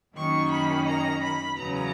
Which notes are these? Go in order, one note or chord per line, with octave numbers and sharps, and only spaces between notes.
F#2 D#3 A#3 C#4 C#6
B5
A#5
B5
E2 C#3 F#3 B3 A#5